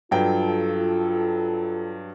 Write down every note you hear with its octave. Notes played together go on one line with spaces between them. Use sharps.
G2 F#3 F4 A4 G5